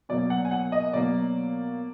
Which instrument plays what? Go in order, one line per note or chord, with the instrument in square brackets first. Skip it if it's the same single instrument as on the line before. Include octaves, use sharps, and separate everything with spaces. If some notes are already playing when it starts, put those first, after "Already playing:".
[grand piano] B2 F#3 A#3 D5
F#5
G#5
F#5
D#5
B2 F#3 A#3 D5